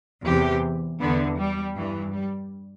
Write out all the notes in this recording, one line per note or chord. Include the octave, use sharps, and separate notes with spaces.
E2 C3 E3 G4
E2 D3 B3
G3
G2 E3
G3